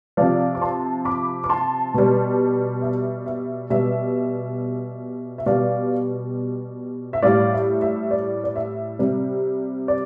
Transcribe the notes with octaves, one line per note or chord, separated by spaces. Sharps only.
C3 F3 D5 F5
D6
A5 C6
B5 D6
D6
A5 C6
B2 G3
E5
E5
B2 G3 E5
E5
B2 G3 D5 F5
E5
A2 G3 D5 F5
E5
E5
D5
D5
E5
C3 G3
D5